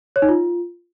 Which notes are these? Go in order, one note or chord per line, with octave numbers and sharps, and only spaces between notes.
C#5
D#4
F4